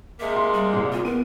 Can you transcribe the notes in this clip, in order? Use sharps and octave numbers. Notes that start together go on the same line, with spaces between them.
C3 G#3 A#3 E5
C6
G3
C2 A#2
F4
B3 A#4 D#7